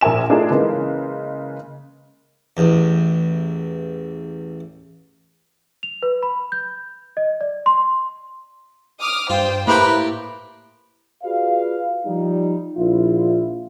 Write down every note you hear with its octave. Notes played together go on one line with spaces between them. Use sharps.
A#1 A#4 E5 G#5 E7
A3 D4 D#4 F4 G#4 A#4
C#3 E3 G#3 A#3
A1 E2
F7
B4
B5
G6
D#5
D5
C6
D6 D#6 F6
G2 F4 C5 G5
A2 A#3 E4 G4 B4 C5 A#5 D6
F4 F#4 G#4 B4 D5 F5
F3 G3 D#4
A#1 E4 F4